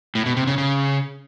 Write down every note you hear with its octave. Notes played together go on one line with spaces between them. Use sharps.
A2
B2
C3
C#3
C#3